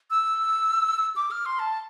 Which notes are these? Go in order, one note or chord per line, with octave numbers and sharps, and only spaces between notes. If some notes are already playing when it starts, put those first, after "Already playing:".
E6
D6
F6
C6
A5